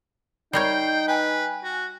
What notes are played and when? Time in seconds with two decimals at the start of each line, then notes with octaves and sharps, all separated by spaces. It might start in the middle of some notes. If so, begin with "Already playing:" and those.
0.53 G3 D#4 A#4 C#5 G5 G6 C7
1.08 B4 G5 G#5
1.64 F#4